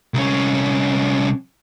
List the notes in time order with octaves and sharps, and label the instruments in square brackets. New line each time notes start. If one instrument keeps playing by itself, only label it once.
[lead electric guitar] C2 C#4